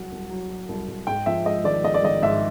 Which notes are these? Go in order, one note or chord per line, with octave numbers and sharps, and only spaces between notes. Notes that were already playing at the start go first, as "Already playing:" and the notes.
Already playing: C2 F#3 F#5
C2
F#3
F#3
C2
C2
G#2 G5
F3 E5
G#3 D#5
G#1 D5
G#3 D#5
D5
G#1 D#5
G#2 E5